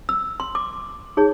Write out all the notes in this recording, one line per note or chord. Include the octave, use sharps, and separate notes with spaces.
E6
C6
D6
D#4 G#4 C#5